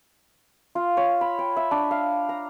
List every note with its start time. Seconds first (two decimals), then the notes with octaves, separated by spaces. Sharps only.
0.75 F4
0.97 C#5
1.21 B5
1.39 G5
1.56 E5
1.71 D4
1.91 F5
2.29 A#5